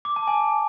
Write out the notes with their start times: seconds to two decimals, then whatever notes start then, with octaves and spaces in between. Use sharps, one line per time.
0.05 D6
0.16 A5
0.27 G#5